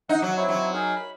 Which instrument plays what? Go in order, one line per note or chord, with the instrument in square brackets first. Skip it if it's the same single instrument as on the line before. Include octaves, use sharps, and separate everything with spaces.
[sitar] D#4 [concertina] F#5
[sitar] F#3
[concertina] C4 E4 C#5
[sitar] F#3
[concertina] D#4 G#4 A#4
B5